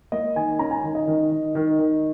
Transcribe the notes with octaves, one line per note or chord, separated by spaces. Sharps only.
A#3 D#5
D#3 G#5
C#4 A#5
G#5
D#3
D#5
D#3
D#3
D#3
D#3